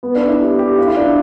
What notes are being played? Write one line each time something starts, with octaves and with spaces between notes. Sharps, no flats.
B3
D4
E4
G4
G4
F4
E4
D4